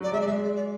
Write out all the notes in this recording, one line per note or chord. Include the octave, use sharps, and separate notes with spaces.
F#3 D5
G#3 E5
D5
G#3 E5
D5
D5